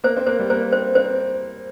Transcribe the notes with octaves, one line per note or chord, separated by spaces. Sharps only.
A#3 C5
C4
A#3 C5
G3
A#3 C5
C4 C5
C4 C5